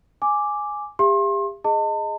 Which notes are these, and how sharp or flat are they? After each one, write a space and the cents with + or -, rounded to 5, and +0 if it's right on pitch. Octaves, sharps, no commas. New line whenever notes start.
G#5 +0 D6 +0
G4 +35 E5 +45 C6 +35
G#4 +0 D#5 +0 A5 +40